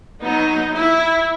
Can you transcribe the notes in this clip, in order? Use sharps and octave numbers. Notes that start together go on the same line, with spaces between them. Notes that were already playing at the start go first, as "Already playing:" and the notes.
F#3 B3 D#4
E4